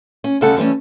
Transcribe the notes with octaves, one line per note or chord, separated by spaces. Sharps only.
C#4
D2 C#3 G3 A4 F#5
D3 E3 G3 A3 C#4